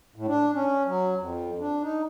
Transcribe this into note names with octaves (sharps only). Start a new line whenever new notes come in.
A2
D4
C#4
F#3
F2
D4
D#4